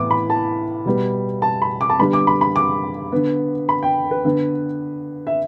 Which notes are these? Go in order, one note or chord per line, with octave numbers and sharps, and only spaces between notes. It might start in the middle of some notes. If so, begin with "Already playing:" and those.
Already playing: A2 E3 B3 D6
B5
A5
B2 G3 B3
A5
B5
D6
A5
D3 G3 B3 B5
D6
B5
B5
D6
D3 B3
B5
G5
B4
D3 B3
E5